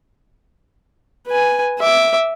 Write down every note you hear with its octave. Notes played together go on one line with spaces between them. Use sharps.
B4 G#5
E5 D6